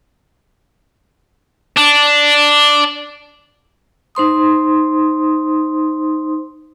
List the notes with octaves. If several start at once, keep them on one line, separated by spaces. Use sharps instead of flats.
D4
D#4 C5 C6 D#6